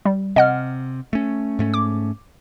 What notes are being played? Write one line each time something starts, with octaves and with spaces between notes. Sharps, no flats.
G3
C3 D#5 F#5 F6
A3 C#4
G#2 A3 C#4
D6